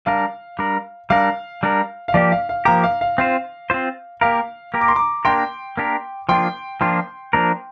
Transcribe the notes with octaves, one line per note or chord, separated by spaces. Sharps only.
G3 D4 A#4 F5
G3 D4 A#4
G3 D4 A#4 F5
G3 D4 A#4
F5
F3 A#3 G4 D5
F5
F5
F3 A#3 G4 F5 A#5
F5
F5
C4 F4 C5 F5
C4 F4 C5
A#3 G4 A#4 F5
A#3 G4 A#4
D6
C6
A#5 D6
A#3 D4 G4 A#4 G5 C6
A#3 D4 G4 A#4
F3 A#3 D4 F4 G5 C6
F3 A#3 D4 F4 G5 C6
F3 A#3 D4 A#4